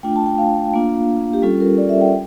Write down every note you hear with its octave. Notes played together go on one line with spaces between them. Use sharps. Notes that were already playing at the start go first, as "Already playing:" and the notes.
A3 D4 F4 G5
A5
G5
F5
A#3 D4 F4
G4
G3 C#4 F4 A4
A#4
D5
E5
G5